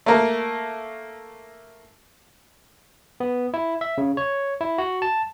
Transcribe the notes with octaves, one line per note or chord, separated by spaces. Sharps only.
A3 A#3 A#4
B3
E4
E5
C#3
C#5
E4
F#4
A5